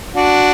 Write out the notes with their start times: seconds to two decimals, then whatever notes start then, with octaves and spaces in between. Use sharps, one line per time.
0.16 D4 F#4